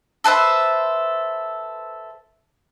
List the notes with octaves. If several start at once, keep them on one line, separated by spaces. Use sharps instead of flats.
A4 B4 C5 E5